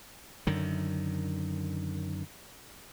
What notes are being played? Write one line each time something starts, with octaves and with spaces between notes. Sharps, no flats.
F#2 D3 D#3